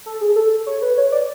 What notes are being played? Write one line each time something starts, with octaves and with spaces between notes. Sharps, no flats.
A4
G#4
A4
C#5
B4
C#5
D5